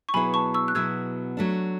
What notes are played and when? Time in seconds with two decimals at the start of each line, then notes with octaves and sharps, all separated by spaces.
0.09 C#6
0.14 B2 F#3 B3 E4 G#4 G#5 B5
0.34 A5 C#6
0.54 C#6 E6
0.68 F#6
0.75 B2 F#3 B3 E4 G#4 E6 G#6
1.37 F#3 A3 D4